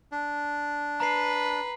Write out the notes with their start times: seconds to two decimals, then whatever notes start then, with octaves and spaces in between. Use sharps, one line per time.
0.12 D4
1.00 B4 A#5 C7